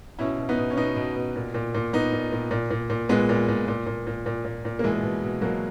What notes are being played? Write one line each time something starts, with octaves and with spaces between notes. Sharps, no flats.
B2 C#4 E4
B2
B3 D#4
B2
C#4
B2 B3 D#4
B2
B2
A#2
A#2
A#2
A#2 B3 D#4
A#2
A#2
A#2
A#2
A#2
A#2 G#3 B3
A#2
A#2
A#2
A#2
A#2
A#2
A#2
A#2
A#3
B2 E3 G#3
B2
B2
B2 F#3 A#3